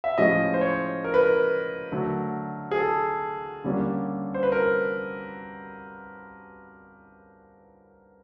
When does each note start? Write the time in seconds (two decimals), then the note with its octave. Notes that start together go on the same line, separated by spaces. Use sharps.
0.04 E5
0.18 A2 F3 G#3 C#4 D#5
0.54 C5
0.61 C#5
1.04 A#4
1.14 B4
1.23 A#4
1.92 D3 F#3 A3
2.71 G#4
2.78 A4
3.64 D3 G3 A#3 C#4
4.34 C5
4.43 B4
4.52 A#4